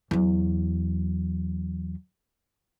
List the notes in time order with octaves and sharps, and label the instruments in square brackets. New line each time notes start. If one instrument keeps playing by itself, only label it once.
[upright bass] E2 F#3